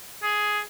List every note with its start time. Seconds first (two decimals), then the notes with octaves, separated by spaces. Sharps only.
0.22 G#4